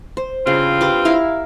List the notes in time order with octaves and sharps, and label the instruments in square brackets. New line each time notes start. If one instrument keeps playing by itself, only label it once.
[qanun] C5
[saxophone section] G2 C4 F4 [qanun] C#3
[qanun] G4 B4 D6
E4 A#4 F5